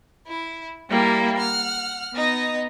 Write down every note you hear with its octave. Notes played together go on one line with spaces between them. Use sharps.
E4
G3 A#3 E4 G4
F#5 F6
B3 D#4 D#5